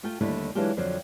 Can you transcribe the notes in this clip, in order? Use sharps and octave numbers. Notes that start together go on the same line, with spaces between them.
A3 F4 A4 G5
D#2 D3 G3 A3 E4
E3 F#3 G#3 D4 F4 G4
F2 D3 F3 F#3 C4